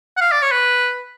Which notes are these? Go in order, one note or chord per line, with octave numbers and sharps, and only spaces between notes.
F#5
F5
D5
C#5
B4